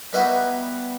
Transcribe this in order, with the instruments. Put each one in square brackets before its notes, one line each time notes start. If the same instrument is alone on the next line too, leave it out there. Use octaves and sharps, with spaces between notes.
[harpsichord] G3 B3 D#4 E4 F#4